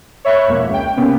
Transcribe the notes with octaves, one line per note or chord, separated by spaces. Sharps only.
C#5 E5 B5 C#6 F#6 G6
F2 G#2 B2 A#3
C#2 G5
C3 A#3 B3 C#4